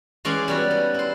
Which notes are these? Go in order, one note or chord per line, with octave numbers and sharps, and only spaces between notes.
E3 G#3 C#4 D5 F#5 C6
G3 B3 F#4
D#4
E4 C5